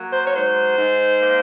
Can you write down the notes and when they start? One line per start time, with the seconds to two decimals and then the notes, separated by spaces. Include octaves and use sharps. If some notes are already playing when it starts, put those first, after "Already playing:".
Already playing: F#3 A#3
0.12 C5
0.24 C#5
0.34 G#2 C5
0.76 G#2
1.18 A#3